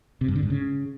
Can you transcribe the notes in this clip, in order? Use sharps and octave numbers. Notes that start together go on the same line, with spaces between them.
C3
G2
D3
G#2
C#3